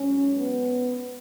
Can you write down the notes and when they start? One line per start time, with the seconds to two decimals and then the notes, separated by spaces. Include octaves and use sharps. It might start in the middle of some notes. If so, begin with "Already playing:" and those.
Already playing: G#2 F#3 C#4
0.37 B3